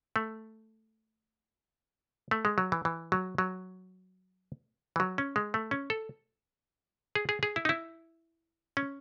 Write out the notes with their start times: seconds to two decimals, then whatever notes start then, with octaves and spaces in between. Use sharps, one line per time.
0.16 A3
2.31 A3
2.45 G#3
2.58 F#3
2.72 E3
2.85 E3
3.12 F#3
3.38 F#3
4.96 E3
5.00 F#3
5.18 C#4
5.36 G#3
5.54 A3
5.71 C#4
5.90 A4
7.15 G#4
7.29 G#4
7.43 G#4
7.56 E4
7.65 D#4
7.69 E4
8.77 C#4